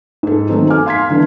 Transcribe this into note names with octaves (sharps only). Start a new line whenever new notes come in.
G#2 A4
D#3 F#3 A3 B3 C4 D#4
G#5 D6 F6
F5 C6 G#6 B6
D3 E3 B3 D4